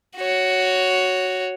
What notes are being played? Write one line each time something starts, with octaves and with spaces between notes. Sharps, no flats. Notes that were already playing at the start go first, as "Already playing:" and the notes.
F#4 C#5